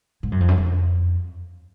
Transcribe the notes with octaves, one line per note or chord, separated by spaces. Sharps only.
G#2
F#2
F2
F#2
F2